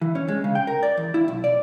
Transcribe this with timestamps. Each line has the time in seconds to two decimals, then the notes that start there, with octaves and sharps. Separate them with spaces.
0.02 E3
0.15 C#4
0.28 G#3
0.44 C#3
0.55 G5
0.67 A#4
0.83 D5
0.97 E2
1.14 E4
1.28 B1
1.44 D5